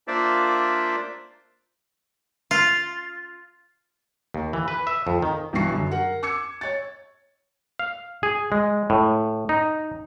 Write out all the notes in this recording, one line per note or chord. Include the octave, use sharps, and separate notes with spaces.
A#3 D4 F4 C5 D5 E5
F4
D#2
E3
B4
E5
F2
D#3
B1 G2 E3 G3 C#6 C7
F#2 D3
A#4 F#5
D6 E6 G#6 C#7
C#5 A6
F5
G#4
G#3
A2
D#4